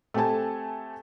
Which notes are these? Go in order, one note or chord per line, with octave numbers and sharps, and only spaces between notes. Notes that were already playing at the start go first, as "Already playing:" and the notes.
A3 C4 G4 A4 G#5 A5